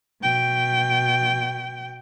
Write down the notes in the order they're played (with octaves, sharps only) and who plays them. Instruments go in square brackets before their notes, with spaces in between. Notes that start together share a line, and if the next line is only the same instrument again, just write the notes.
[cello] B2 G5